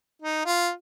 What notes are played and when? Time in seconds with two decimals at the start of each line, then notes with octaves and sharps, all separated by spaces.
0.22 D#4
0.46 F4